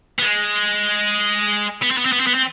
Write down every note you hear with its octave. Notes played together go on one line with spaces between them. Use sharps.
B3
G#3
B3
C4
B3
C4
B3
C4
B3
C4